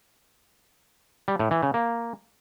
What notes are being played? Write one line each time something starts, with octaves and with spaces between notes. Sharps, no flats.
G3
A2
E3
C#3
A#3